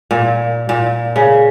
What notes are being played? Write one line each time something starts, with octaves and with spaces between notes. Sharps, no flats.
A#2
A#2
C#3